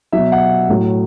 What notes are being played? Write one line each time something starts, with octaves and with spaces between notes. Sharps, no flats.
B2 F#3 E5
F#5
A2 F#3